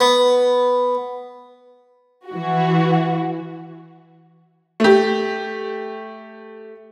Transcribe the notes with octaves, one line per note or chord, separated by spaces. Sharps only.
B3
E3 F#4
A3 G4